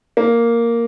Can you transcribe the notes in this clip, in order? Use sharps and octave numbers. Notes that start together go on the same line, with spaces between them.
A#3